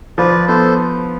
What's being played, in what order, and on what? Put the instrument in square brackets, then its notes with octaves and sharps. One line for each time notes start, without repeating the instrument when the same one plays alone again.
[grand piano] F3 [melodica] B4 D5
[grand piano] B3 [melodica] A4 C5